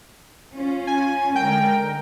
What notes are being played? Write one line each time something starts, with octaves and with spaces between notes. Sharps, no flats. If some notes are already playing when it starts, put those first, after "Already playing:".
C#4 F4
G#5
D3 G#3 A#4 G5